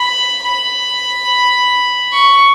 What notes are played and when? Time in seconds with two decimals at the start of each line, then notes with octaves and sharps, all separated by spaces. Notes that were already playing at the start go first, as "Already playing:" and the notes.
Already playing: B5
0.44 B5
2.13 C#6